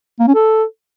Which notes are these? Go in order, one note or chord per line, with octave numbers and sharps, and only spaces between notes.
A#3
C#4
A4